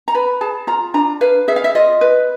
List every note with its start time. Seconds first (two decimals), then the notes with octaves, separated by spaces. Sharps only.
0.08 A#5
0.14 B4 B5
0.41 G#4 A5
0.67 F4 A#5
0.94 D4 A#5
1.21 B4 F5
1.48 G#4 E5
1.56 F5
1.64 E5
1.75 F4 D#5
2.01 B4